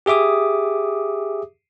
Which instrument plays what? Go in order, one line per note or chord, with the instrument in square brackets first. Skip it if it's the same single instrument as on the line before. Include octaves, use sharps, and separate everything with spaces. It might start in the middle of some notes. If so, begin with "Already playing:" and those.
[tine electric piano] G4 G#4 E5 D6 D#6